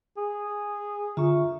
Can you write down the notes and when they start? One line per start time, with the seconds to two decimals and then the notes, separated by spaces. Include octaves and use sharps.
0.17 G#4
1.17 D3 F4 E5 A#5 C#6